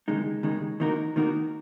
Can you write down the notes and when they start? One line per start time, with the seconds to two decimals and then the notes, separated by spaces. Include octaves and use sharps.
0.08 D#2 C#3 G#3 D#4
0.43 D#2 C#3 G#3 D#4
0.80 D#3 A#3 D#4 F#4 A#4
1.16 D#3 A#3 D#4 F#4 A#4